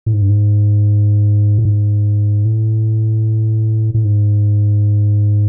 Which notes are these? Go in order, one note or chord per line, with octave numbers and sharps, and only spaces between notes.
A2
G#2
G2
G#2
A2
G#2
A2
A2
G#2